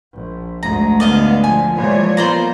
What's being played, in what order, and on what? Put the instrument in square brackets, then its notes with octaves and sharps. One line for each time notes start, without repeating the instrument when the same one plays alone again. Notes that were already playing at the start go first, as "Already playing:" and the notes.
[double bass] A#1
[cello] D2 G#2 [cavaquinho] A#5
[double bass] D3 [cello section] B3 [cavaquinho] D5 D#5 F5
[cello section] A#2 F3 [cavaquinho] G#5
[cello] A#2 G#3 [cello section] E3 C#5 [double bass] F3 G3
[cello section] A#3 B3 [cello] F4 [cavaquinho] C5 D5 A#5